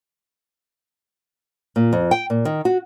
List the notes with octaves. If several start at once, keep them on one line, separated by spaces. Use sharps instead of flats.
A#2
F2
G5
A#2
D#3
F#4